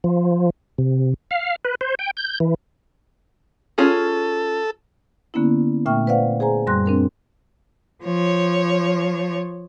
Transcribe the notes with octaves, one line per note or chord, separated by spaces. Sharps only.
F3
C3
F5
B4
C5
G5
G6
E3
C#4 F4 G#4 A4
D3 A#3 B3 C#4 E4
A#2 A3 E5 G5 C#6 F6
B4 C5 D5 F5 F#5
G#4 C5 G#5 A#5
F#2 G3 C6 F#6 A#6
C4 D4 A#4
F3 C#5